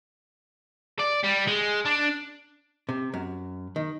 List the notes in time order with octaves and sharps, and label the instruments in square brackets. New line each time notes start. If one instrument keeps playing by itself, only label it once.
[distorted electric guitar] D5
G3
G#3
D4
[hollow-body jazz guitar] C3
F#2
D#3